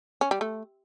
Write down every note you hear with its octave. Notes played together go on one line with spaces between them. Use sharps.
C#4
G3
A3